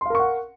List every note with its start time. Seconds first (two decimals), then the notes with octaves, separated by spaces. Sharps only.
0.01 C6
0.06 F5
0.10 A#4
0.15 C#6
0.19 F#5